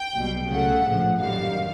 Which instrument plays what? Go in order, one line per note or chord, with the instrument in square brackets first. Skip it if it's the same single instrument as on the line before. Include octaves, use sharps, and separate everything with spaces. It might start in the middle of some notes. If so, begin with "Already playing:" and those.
Already playing: [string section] G5
B1 B2 G3
C#2 C#3 F#3 A3 F#5
A#1 A2 F3
F#2 D#3 G3 F5